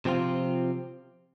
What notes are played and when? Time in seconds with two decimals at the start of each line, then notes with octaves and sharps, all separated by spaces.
0.05 C3 F3 C4 F4